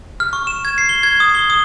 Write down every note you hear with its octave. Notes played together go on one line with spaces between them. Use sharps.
F6
C#6
E7
G#6
C7
G7
G#6
D#6
G7
D#6